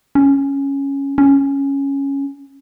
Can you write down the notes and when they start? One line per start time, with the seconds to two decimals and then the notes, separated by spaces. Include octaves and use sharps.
0.15 C#4
1.18 C#4